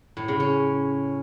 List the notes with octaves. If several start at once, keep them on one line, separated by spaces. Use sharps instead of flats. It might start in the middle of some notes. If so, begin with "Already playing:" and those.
A2
C#3
C#4